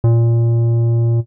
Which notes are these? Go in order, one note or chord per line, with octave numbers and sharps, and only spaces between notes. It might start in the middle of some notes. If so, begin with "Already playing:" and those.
A#2